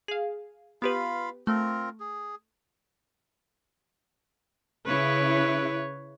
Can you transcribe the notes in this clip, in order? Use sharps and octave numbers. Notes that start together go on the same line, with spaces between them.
G#4 F5
B3 F4 G4 B4 F5 B5
A3 C4 F4 A#4
G#4
C#3 E4 B4 C#5